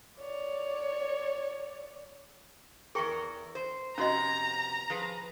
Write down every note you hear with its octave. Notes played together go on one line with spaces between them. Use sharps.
C#5 D5
E2 G#4 A#4 G5 C#6
C5
F2 C3 B3 C#4 F#4 D#5 A#5
F3 G#4 B4